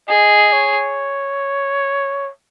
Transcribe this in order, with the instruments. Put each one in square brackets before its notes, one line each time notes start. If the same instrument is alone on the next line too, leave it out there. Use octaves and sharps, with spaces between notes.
[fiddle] G#4 [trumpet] D#5
[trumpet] C#5